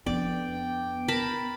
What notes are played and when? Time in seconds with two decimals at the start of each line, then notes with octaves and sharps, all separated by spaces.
0.06 F2 B3 D4 D5 G5
1.08 A#4 A5 B5